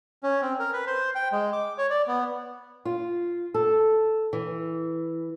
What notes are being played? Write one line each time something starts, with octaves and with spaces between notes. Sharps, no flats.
C#4
C4
A#4
B4
C5
G5
G#3
D6
C#5
D5
B3
F4
A4
E3